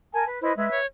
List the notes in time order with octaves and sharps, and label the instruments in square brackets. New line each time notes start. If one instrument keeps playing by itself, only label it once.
[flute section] A#4 G#5 A5
B4
[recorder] E4 [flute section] B4 C5 D#5
[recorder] G#3 [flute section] B4 E5
[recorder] C#5